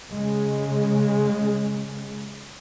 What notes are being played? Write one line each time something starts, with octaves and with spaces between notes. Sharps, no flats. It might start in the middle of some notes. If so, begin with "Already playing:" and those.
C#3 G#3